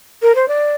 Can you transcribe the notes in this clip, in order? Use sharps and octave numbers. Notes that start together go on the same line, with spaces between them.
A#4
C5
D5